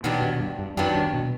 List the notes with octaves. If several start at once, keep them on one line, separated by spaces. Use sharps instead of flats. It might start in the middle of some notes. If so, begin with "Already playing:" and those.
B2 D#3 F#3 B3 D4 G4
B2
G2
G2
F#2 D#3 F#3 B3 D4 G4
G2
B2